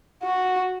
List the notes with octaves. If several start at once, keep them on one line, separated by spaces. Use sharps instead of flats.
F#4